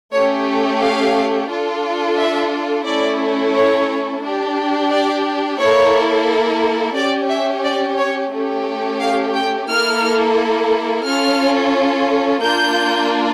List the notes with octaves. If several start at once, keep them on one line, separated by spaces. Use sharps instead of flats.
A3 C#4 G4 C#5
F5
D4 F4 A4
E5
A3 C#4 E4 A4 D5
C#5
D4 G4
D5
A#3 E4 A4 C#5
C#4 G4 D5
E5
D5
C#5
A3 C#4 G4
F5
G5
A#3 E4 A4 F6
C#4 F4 A4 F6
A#3 D4 F4 G6